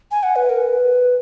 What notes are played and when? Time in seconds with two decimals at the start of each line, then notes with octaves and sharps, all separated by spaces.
0.11 G#5
0.23 F#5
0.36 B4
0.50 A#4
0.62 B4